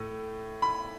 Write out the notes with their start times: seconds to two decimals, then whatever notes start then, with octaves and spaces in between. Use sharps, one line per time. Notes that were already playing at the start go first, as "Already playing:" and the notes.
Already playing: A2 A3
0.62 B5